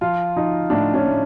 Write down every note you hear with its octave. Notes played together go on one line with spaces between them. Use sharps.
F3 F4
F3 D#4
A2 D4
C#4
A2